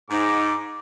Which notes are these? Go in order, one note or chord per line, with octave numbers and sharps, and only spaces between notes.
G#2 D#4 D6